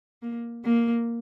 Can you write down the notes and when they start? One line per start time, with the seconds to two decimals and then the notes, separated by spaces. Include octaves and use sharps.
0.22 A#3
0.65 A#3